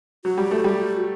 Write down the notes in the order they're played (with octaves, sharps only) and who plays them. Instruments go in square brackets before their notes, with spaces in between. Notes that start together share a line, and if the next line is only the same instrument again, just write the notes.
[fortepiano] F#3 [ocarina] F#4
[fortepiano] G3
A3
G3